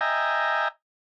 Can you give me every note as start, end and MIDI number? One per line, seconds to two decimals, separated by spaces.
0.01 0.68 75
0.01 0.68 76
0.01 0.68 79
0.01 0.68 80
0.01 0.68 82